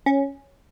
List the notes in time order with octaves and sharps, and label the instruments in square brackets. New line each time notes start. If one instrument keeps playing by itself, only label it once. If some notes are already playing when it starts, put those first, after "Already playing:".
[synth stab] C#4